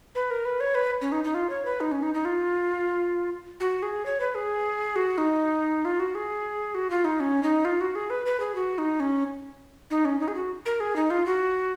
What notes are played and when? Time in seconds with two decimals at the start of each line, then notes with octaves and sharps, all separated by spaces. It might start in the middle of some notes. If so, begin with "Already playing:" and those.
0.15 B4
0.31 A#4
0.45 B4
0.60 C#5
0.75 B4
1.01 C#4
1.12 D#4
1.24 D#4
1.34 F4
1.50 C#5
1.65 B4
1.81 D#4
1.92 C#4
2.03 D#4
2.14 D#4
2.25 F4
3.60 F#4
3.83 G#4
4.06 C#5
4.20 B4
4.35 G#4
4.96 F#4
5.18 D#4
5.85 F4
6.00 F#4
6.15 G#4
6.75 F#4
6.90 F4
7.05 D#4
7.20 C#4
7.43 D#4
7.65 F4
7.81 F#4
7.95 G#4
8.10 B4
8.26 B4
8.40 G#4
8.55 F#4
8.78 D#4
9.00 C#4
9.91 D#4
10.05 C#4
10.20 D#4
10.28 G#4
10.35 F#4
10.66 A#4
10.80 G#4
10.96 D#4
11.10 F4
11.26 F#4